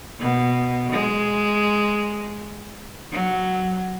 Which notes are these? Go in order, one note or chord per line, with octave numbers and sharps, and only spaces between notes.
B2
G#3
F#3